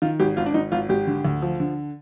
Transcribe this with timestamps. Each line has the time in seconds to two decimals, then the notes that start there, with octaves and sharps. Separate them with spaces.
0.02 D#3 F4
0.20 G#1 G4
0.37 G#1 F4
0.46 D4
0.54 G#1 D#4
0.72 G#1 F4
0.89 G#1 G4
1.07 D3
1.25 D2
1.42 F3
1.60 D3